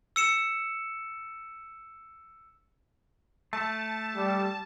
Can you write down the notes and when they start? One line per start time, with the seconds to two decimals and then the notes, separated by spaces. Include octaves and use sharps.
0.16 E6 C#7 E7
3.53 A3 A5
4.15 G3